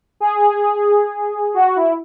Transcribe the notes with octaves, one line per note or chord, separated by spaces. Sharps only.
G#4
F#4
E4